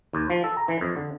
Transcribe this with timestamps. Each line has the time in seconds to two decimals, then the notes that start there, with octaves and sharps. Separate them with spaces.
0.13 D#2
0.30 F3
0.44 A4
0.57 A#5
0.68 E3
0.81 F2
0.97 D3